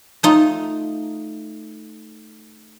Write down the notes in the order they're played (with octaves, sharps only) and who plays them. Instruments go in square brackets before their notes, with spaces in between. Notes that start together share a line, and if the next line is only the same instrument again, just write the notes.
[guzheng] A3 D#4 F4